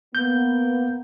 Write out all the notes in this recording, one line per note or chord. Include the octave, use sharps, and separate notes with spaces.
A#3 B3 G6